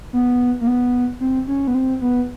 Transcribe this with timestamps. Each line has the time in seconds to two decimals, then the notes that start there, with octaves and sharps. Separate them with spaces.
0.13 B3
0.61 A#3
0.67 B3
1.20 C4
1.48 C#4
1.67 B3
1.75 C4
2.01 B3